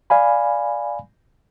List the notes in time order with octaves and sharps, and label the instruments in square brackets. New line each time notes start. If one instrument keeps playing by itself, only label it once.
[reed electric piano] D5 F5 G#5 B5